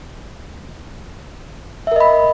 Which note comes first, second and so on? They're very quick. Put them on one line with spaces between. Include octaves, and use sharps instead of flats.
E5 A#4 D#5 B5